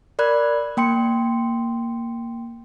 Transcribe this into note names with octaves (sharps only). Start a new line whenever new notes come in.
A#4 D5 B5 F#6 G#6
A#3 G5 C6 C#7